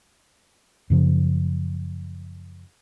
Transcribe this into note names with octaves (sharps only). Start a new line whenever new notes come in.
F#2 C#3 F3